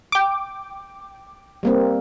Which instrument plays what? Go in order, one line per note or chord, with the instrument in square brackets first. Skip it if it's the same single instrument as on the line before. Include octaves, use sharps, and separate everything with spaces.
[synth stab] G5 D6
[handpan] G3 A#3 C4